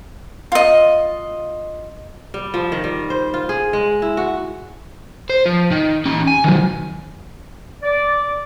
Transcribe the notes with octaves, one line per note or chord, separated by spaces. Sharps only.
F4 D#5
G3
F3
D#3
G3
C5
F4
G#4
G#3
E4
F#4
C5
F3
D#3
C#4 G4
G#5
D#3 F#3
D5